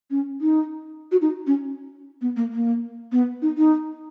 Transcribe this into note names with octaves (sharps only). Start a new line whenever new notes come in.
C#4
D#4
F#4
D#4
C#4
B3
A#3
A#3
B3
D#4
D#4